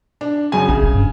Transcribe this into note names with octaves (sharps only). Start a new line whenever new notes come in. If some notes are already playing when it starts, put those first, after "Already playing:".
D4
F#2 C#3 G#5
A#1 C#3
F1
G2